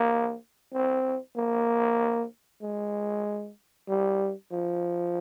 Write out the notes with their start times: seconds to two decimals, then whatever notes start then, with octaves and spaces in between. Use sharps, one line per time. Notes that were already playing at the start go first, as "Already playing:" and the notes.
Already playing: A#3
0.74 C4
1.36 A#3
2.62 G#3
3.88 G3
4.52 F3